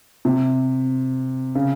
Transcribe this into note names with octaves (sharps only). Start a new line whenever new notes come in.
C3
C#3